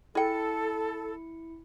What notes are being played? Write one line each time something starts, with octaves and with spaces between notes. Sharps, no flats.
E4 G#4 A4 G5 C#7